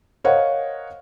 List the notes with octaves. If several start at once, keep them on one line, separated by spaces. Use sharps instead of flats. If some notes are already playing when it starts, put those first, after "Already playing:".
A#4 C5 C#5 D#5 F5 F#5